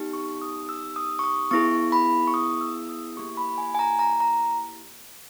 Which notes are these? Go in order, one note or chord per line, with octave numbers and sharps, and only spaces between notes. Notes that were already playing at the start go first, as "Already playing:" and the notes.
Already playing: B3 D#4 G4
C#6
D#6
E6
D#6
C#6
D#6
B3 E4 G#4 C#6
B5
C#6
D#6
E6
D#6
A#3 E4 G4 C#6
B5
G#5
G#5
A#5
A#5
A#5